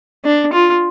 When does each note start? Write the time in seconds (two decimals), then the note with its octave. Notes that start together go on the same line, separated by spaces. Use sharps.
0.25 D4
0.52 F4